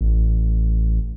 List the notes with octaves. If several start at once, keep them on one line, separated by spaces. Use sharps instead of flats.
A1